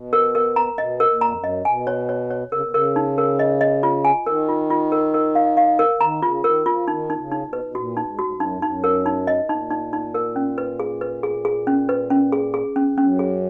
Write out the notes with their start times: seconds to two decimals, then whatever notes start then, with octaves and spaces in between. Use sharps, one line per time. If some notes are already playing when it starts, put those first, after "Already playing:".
Already playing: B2
0.13 A#4
0.35 A#4
0.56 A#5
0.73 A#2
0.78 B2 D#5
1.00 A#4
1.07 A#2
1.21 F2 A#5
1.36 F#2
1.44 D#5
1.65 B2 G#5
1.87 C#5
2.09 C#5
2.30 C#5
2.52 C#3 A#4
2.62 B2
2.72 C#3 A#4
2.96 D#4
3.18 A#4
3.39 D#5
3.61 D#5
3.83 F4
4.05 G#5
4.26 D#3 A#4
4.48 F4
4.70 F4
4.92 A#4
5.14 A#4
5.35 F5
5.57 F5
5.79 A#4
6.01 D#3 A#5
6.22 C#3 F4
6.44 D#3 A#4
6.66 F3 F4
6.88 D#3 D#4
7.10 D#4
7.17 C#3
7.31 D#4
7.46 B2
7.53 B4
7.64 B2
7.75 A#2 F#4
7.97 D#4
8.04 G#2
8.19 F#4
8.24 G#2
8.33 F#2
8.40 D#4
8.51 F2
8.62 F#2 D#4
8.84 A#4
9.06 D#4
9.27 D#5
9.49 A#2 D#4
9.70 D#4
9.93 D#4
10.14 A#4
10.36 C#4
10.58 B4
10.80 G#4
11.01 B4
11.23 G#4
11.45 G#4
11.67 C#4
11.89 B4
12.10 C#4
12.32 G#4
12.54 G#4
12.76 C#4
12.90 F2
12.98 F#2 C#4
13.19 G#4